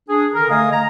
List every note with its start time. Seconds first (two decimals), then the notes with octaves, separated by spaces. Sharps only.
0.09 D4 G#4
0.34 D3 A#4
0.49 D3 A3 D#5 F5 G#5 D#6
0.72 A#5